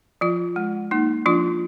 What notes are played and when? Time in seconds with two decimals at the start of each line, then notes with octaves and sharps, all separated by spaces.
0.21 F3 F4
0.56 G#3
0.91 A#3 D#4
1.26 F3 D4 F4